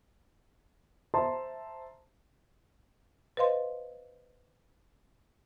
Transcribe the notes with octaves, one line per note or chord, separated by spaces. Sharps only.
C5 E5 A5 A#5 C6
B4 C5 D#5 F5 C6